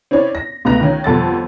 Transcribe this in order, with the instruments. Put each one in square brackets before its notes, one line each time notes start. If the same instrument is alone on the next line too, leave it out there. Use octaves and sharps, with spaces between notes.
[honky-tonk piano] C4 C#4 E4 C#5 D5
A#6
C#2 A3 B3 A#5 F#6 A#6
D#3 C#4
G1 F2 A4 F#5 E6 A6